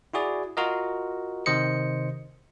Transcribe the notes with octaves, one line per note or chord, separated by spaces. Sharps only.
E4 F#4 G#4 D5
F4 F#4 A#4 D#5
C3 D#3 C5 D#5 C#7